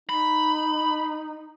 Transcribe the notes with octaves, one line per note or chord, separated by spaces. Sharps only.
D#4 B5